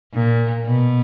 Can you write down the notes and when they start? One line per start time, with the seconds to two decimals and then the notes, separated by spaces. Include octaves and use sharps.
0.14 A#2
0.65 B2